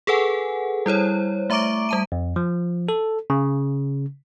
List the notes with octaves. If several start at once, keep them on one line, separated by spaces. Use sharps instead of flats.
G#4 A4 B4 F#5 G#5
G3 E4 C5 C#5
A3 E5 A#5 C#6 D6 D7
G3 A5 D#7
F2
F3
A4
C#3